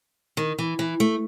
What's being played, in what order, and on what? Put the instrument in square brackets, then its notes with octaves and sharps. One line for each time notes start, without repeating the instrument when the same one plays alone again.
[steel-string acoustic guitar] D#3
E3
E3
A3